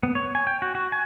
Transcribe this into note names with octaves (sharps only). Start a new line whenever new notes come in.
B3
C#5
G#5
G5
F#4
F#4
G#5